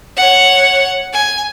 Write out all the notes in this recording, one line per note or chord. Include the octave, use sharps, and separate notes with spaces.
C#5 F#5
G#5